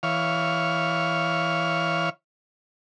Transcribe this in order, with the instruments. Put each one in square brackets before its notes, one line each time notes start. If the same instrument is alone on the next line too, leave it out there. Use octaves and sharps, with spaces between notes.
[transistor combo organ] E3 C#5 F5